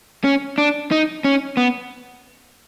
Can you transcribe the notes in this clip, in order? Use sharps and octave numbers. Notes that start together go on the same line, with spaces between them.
C#4
D4
D#4
C#4
B3